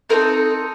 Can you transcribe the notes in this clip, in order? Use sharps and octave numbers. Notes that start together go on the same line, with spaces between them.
C4 D#4 A4 A#4